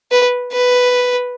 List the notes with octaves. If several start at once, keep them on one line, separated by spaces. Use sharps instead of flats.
B4
B4